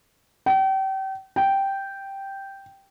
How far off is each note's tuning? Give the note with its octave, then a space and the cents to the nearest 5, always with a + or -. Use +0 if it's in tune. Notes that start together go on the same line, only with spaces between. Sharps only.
G5 -35
G5 -5